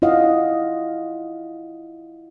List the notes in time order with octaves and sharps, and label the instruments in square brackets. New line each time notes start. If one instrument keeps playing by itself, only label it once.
[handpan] E4 F4 D#5 F5 F#5